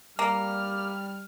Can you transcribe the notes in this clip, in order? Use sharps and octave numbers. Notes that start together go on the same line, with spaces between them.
G3 A#3 F6